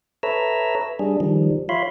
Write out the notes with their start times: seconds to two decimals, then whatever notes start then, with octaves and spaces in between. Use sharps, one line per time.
0.23 A4 B4 C#5 E5 A#5 E6
0.99 G3 D4 G#4
1.20 D#3 F3 G3
1.69 F4 C#5 E5 F5 B5 C6